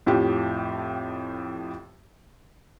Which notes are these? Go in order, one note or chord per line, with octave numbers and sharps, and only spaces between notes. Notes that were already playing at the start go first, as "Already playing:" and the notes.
F2 A2 F3 G4